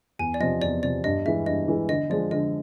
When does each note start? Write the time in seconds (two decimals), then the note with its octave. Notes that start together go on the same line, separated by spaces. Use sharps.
0.19 E2 G#5
0.34 D5
0.40 C3 F3 D#5
0.62 E2 D5
0.83 C3 F3 D5
1.04 G2 D#5
1.25 E3 G#3 E5
1.46 G2 D#5
1.68 E3 G#3
1.89 D3 D#5
2.10 F3 G#3 D5
2.31 D3 D#5